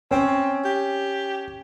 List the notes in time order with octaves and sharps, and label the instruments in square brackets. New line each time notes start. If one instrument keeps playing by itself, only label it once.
[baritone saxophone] C4 [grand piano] C#4
[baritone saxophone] G4